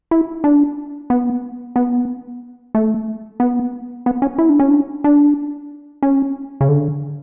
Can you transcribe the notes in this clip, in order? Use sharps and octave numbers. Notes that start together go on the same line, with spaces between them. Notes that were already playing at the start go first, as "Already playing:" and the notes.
E4
D4
B3
B3
A3
B3
B3
C#4
E4
D4
C#4
D4
D4
C#4
C#3
D3